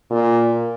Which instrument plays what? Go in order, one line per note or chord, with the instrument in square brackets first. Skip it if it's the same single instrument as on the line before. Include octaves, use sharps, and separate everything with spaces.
[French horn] A#2